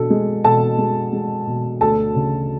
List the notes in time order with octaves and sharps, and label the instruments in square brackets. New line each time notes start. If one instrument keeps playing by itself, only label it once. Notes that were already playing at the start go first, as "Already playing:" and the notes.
Already playing: [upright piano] B2 D4 A4
G#3
B2 A4 A5
G#3
G#3
B2
D2 A4 A5
C#3